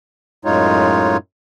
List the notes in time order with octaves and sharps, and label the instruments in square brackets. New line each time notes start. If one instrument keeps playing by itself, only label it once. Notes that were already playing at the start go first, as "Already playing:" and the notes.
[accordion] F#2 A2 G#3 D#4 F4 C#5